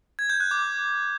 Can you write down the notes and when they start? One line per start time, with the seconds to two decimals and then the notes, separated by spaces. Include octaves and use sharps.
0.19 G#6
0.30 G6
0.40 F#6
0.51 D6